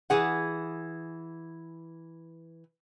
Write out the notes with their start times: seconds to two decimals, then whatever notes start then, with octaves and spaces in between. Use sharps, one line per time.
0.10 E3 G#4 F#5